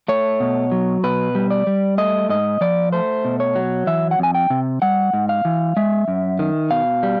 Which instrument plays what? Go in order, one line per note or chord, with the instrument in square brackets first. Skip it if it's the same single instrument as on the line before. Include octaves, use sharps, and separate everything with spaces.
[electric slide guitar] A3 C#5
B2
F#3
B2 B4
G3
D5
G3
A3 D#5
G#2 D#5
F3 D5
A3 C5
B2
C#5
F#3
E3 E5
F#5
F2 G#5
G5
C3
G3 F#5
G#2
F5
E3
G#3 E5
F#2
D#3
B2 F5
G3